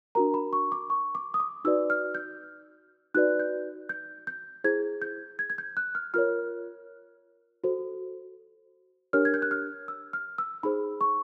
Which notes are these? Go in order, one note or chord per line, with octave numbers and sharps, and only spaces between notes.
D4 F#4 A#4 A#5
B5
C#6
D6
C#6
D6
D#6
D6
D#4 F#4 B4 D5 E6
F6
G6
D#4 F#4 B4 D5 F#6
G6
G6
G6
E4 G#4 C5 G#6
G6
G#6
G#6
G6
F#6
F6
F4 A#4 C#5 F6
F#4 A4 C5
D4 G4 A#4 C#5 F6
G#6
G6
F#6
F6
E6
F6
E6
D#4 G#4 C5 B5
C#6